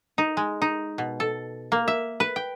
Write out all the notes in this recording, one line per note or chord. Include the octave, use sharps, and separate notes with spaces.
D#4
G#3
D#4
B2
A4
A#3
E5
B4
G5